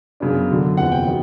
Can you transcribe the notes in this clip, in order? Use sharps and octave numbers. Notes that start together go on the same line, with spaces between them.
F#2 C#3 F#3 B3 D4
F#2 D3 F#3
F#1 E2 C3 F3 F#5
G5
D#3 F#3 B3